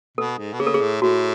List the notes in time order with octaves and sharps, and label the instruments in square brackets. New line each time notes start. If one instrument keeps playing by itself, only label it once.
[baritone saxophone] B2 [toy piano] A4
[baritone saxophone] G#2
B2
[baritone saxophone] C#3 [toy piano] G#4
[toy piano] A4
G#4
[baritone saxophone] A2
[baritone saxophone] A2 [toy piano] F#4